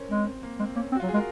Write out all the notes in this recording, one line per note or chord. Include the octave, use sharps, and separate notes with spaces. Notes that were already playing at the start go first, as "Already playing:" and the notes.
Already playing: C#4 A#4 C5
G#3 C4
C4
A#3
G#3 C4
A#3 C#4
C4
F#4
F4
F#3
G#4
G#3 A#4